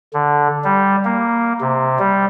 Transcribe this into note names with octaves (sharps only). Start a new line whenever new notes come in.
D3
G3
A#3
C3
G3